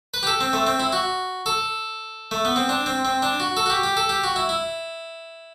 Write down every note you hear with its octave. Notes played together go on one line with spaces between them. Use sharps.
B4
G4
A4
C4
A3
C4
E4
F#4
A4
A3
B3
C4
D4
C4
C4
D4
F#4
A4
F#4
G4
G4
A4
G4
F#4
E4
E4